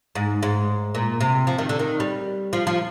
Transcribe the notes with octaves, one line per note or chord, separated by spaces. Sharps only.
G#2
G#2
A#2
C3
F3
D#3
D3
D#3
G3
F3
F3